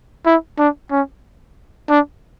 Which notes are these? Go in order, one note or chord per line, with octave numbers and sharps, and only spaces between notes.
E4
D4
C#4
D4